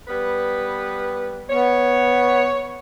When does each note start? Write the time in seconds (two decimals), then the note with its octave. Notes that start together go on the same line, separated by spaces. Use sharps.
0.08 G3 B3 B4
1.50 B3 C#5